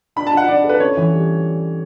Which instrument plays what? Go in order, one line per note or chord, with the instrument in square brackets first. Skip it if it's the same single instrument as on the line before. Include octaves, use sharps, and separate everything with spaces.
[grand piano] D4 [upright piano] B5
[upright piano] A5
[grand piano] D4 [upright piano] F#5
[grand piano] D4 [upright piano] D5
[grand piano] A4
[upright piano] B4
[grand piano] C#4 [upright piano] C#5
[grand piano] E3
G3